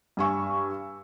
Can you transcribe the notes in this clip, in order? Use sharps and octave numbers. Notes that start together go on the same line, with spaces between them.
G2 G#5 C#6 E6